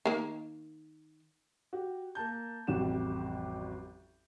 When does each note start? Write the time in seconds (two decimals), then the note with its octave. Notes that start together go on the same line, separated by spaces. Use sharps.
0.05 D#3 A#3
1.73 F#4 G4
2.15 A#3 A5 G6
2.67 A1 F2 C3 G3 F#4 E7